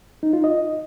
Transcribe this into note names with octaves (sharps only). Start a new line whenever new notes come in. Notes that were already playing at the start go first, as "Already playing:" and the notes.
D#4
F4
D#5